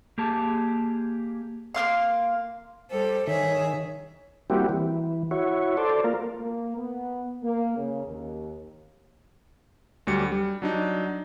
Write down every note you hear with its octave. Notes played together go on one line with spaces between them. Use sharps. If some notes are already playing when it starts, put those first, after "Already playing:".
A#3 G4 G#4 A5
A#3 B3 F5 C6
G3 A4 C5
D#3 G#4 C#5 E5
G3 A#3 C4 E4 F#4 G4
E3
E4 F#4 C#5
A4 C5 D5
A#3 F4 A#4
A#3
B3
A#3
C#3
D#2
D2 F#3 G3 C#7
G3
F#3 D4 D#4